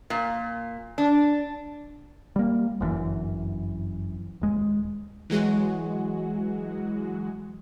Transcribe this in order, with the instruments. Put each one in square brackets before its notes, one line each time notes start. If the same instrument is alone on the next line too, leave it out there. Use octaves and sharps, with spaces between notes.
[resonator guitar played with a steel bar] A#2
D4
[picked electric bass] G3 A#3
G1 F#2 B2 E3
D#1 G#3
[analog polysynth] E3 F#3 G#3 F#4